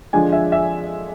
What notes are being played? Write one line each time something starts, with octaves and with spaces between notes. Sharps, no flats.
D3 F3 G#3 D4 F4 G#5
E5
E5